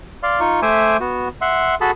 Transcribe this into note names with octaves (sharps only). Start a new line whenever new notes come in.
D5 F5 C6
D#4 F4 C#6
A3 C5 E5 G#5 D6
B3 F#4
E5 F#5 C6
F#4 G#4 A4 A5 B5